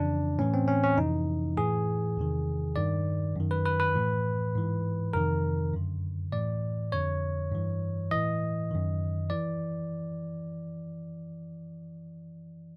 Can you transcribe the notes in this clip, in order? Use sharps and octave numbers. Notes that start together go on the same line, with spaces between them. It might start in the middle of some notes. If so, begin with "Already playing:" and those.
Already playing: F2 C#3 E3 D4
A2 E3 C#4
C4
C#4
C#4
F2 C3 E3 D#4
A2 E3 G#4
E2 C3 D#3
G2 D#3 D5
F#2 D#3
B4
B4
B4
A2 E3
G#2 E3
F2 C3 D#3 A#4
F#2 D3
A2 E3 D5
F2 D3 C#5
G2 E3
A2 E3 D#5
F#2 D#3
E3 D5